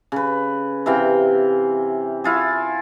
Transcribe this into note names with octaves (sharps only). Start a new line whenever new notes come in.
C#3 B4
C3 E3 F5 G5
E4 F4 G#4